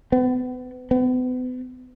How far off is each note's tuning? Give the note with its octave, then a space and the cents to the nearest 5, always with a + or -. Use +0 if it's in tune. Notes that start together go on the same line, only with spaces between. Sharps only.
B3 +35
B3 +40